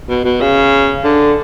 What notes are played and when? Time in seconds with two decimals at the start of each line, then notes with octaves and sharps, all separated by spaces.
0.09 B2
0.25 B2
0.41 C#3
1.05 D3